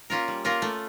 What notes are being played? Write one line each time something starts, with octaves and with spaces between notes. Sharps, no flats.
A#3 C#4 F4 A#4
G3
A#3 C#4 F4 A#4
A3